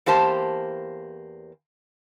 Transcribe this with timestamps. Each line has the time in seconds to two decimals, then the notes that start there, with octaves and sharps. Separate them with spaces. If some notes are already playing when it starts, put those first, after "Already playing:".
0.06 E2 A#3 G4 C5 A5